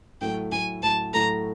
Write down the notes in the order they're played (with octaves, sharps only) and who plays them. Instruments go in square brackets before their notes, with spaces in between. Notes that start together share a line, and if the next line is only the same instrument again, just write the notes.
[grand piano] A2 F#3 A3 [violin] G5
[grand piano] A2 F#3 A3 [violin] G#5
[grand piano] A2 F#3 A3 [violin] A5
[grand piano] A2 F#3 A3 [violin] A#5